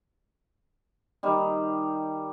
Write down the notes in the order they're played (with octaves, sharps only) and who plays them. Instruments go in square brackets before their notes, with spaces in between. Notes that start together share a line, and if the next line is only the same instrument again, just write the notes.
[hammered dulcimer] D#3 G3